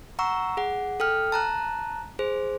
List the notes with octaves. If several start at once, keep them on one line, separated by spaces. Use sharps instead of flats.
F#5 A#5 C#6 E6
G#4 F#5
A4 G5 F6
A5 A#5 F#6
G#4 C5